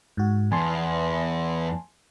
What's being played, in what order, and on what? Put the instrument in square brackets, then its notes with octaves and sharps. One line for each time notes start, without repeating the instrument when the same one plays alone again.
[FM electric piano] G#2 F#4
[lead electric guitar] E2 [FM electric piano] G#5 A5 C6